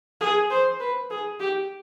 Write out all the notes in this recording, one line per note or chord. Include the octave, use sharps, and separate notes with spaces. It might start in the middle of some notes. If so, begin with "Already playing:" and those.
G#4
C5
B4
G#4
G4